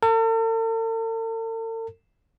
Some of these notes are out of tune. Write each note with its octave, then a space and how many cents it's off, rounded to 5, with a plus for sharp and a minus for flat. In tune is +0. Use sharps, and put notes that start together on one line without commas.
A4 +45